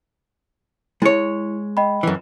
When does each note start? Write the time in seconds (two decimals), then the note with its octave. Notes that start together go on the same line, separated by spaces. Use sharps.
1.02 G#3 E4 C#5
1.77 D#5 G5 B5
2.03 F#2 E3